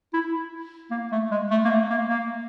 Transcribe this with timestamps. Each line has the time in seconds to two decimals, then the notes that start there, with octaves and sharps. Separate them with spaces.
0.13 E4
0.91 A#3
1.12 A3
1.31 G#3
1.51 A3
1.65 A#3
1.70 A3
1.90 A#3
2.09 A#3